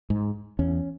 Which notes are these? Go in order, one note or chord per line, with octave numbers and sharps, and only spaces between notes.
G#2
E2 C#4